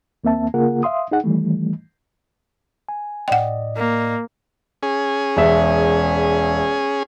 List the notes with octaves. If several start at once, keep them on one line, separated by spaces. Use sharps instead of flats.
D#2 A#3 C4 E5 A5
C#3 A#3 F4 G#4 A#4 F#5
E5 F5 C6 D#6
D#4 G#4 F#5
D#3 E3 G3 A3
G#5
A2 D5 D#5 F#5 G5
A#3
C#4 G#4
E1 E5